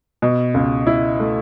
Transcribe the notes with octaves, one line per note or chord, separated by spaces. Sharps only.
B2
C#2
E4
A3